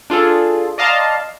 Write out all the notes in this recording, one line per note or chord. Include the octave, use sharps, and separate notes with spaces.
D4 F4 G#4 A4
D5 D#5 F5 A5 A#5 C6